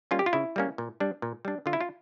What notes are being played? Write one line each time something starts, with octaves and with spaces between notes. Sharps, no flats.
G3 A#3 C#4 F4
G4
F4
C#3 E4
G3 A#3 C#4
A#2
G3 D4
A#2
G3 D4
D3 F4
E4
F4